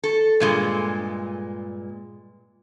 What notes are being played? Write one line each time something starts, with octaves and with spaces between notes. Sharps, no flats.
A4
G2 A#2 G#3